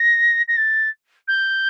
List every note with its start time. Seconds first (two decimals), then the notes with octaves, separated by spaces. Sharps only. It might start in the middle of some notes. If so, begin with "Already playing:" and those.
Already playing: A#6
0.48 A#6
0.57 A6
1.28 G6